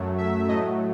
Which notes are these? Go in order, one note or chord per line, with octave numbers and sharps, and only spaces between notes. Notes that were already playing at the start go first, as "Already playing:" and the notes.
Already playing: F#2 F#3 A3
E5
A2 F#3 A3 D#5